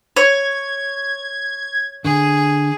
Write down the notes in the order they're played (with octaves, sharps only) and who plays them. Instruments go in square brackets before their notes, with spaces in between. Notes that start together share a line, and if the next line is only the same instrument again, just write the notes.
[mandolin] C#5 [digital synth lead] G#6
[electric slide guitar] D3 [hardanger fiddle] G#4